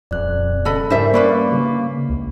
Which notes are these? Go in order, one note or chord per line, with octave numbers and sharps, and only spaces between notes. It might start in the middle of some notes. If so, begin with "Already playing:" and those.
D#1 F2 D5 F#6
C#3 A4 D#5 B5
G#2 G3 D4 E4 A#4 C5 E5
A#3 C#4 B4 D5 C#6
C#3
C#2